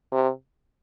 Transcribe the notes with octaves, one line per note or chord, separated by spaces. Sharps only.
C3